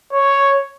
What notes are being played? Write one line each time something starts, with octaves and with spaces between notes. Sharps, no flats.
C#5